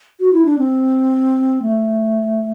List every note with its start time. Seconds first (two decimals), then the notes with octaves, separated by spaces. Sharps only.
0.20 F#4
0.33 E4
0.45 D4
0.59 C4
1.62 A3